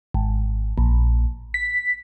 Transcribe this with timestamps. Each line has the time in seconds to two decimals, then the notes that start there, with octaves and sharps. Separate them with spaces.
0.14 G#1
0.78 A#1
1.54 B6